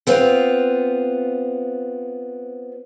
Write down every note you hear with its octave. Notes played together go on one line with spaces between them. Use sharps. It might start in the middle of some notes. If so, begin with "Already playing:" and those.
B3 C4 F4